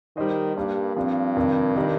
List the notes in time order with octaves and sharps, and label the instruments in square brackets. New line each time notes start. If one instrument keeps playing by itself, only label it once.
[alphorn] D#3 [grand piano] G3 D#4 C5 D#5
[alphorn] G2 [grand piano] G3 A#3 G4
[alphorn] G2 [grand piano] F3 C4 F4
[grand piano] F2 C3 D#3
D#3 G3 D#4